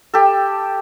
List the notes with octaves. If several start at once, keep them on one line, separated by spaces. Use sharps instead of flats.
G4 A4